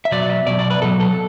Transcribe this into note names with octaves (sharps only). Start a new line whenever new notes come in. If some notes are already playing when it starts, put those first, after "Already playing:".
E5
B2 F#3 D5
E5
B2 F#3 D5
D5
B4
B2 F#3 A4
A4